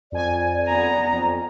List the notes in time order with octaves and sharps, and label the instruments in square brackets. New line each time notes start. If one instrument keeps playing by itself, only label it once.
[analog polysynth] F2 G#5 [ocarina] D5
[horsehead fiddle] B3 A#5
[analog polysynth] F2